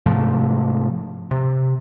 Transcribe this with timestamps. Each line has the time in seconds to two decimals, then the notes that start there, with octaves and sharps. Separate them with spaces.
0.06 G#2 C3 F3 A3
1.31 C3